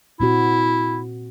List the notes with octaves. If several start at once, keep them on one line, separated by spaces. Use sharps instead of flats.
A#2 C4 E4 F#4